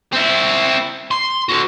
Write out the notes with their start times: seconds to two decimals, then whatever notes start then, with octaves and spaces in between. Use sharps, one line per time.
0.13 C4 E4
1.11 C6
1.49 F#4 A4